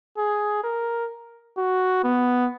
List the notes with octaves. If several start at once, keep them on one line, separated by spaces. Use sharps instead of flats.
G#4
A#4
F#4
B3